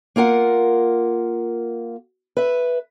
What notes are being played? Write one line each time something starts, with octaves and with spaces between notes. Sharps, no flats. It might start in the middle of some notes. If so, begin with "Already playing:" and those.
A#3 F4 A#4 F#5
B4 E5